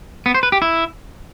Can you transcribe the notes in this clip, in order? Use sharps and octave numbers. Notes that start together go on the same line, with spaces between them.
B3
C5
B4
G4
E4